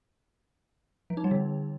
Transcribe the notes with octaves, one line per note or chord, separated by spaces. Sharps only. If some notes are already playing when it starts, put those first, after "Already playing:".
F3
D#4
G3
D3